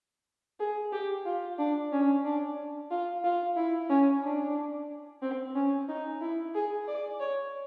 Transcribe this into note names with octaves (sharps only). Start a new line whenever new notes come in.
G#4
G4
F4
D4
C#4
D4
F4
F4
E4
C#4
D4
C4
C#4
D#4
E4
G#4
D5
C#5